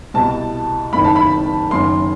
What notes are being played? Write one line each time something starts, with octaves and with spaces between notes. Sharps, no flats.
C2 B2 A5
F#1 F#2 D#3 B5
A5
B5
F#1 F#2 D#3 C6